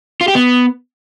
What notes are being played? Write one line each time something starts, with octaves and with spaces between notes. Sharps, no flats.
F4
G4
B3